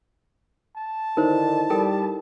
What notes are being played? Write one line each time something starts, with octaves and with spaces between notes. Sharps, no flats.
A5
D3 D#3 D#4 E4 A#4 C5
G3 A4 A#4 G5